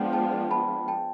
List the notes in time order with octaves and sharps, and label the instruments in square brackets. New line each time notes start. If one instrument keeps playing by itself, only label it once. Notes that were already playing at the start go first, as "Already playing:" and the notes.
Already playing: [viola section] F3 G#3 B3 D4 F4 [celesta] F#5 G5 A5
[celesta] G5 A5
A5 B5
G5 A5